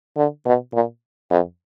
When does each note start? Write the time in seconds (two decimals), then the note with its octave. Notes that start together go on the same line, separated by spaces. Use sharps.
0.17 D3
0.46 B2
0.73 A#2
1.30 F2